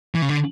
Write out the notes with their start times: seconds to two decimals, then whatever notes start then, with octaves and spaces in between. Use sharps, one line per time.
0.15 E3
0.22 C#3
0.29 D3